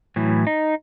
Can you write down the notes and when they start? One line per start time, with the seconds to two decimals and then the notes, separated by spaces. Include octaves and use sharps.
0.16 A2 E3 F#3
0.47 D#4